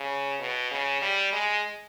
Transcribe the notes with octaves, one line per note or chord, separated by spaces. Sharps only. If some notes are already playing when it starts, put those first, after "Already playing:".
Already playing: C#3
B2
C#3
G3
G#3